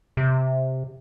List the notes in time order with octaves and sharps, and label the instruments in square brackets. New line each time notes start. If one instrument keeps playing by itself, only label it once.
[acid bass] C3